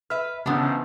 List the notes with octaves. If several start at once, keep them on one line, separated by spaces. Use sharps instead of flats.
B4 E5 F6
G#2 C#3 E3 F3 A3 B3 C#4 D4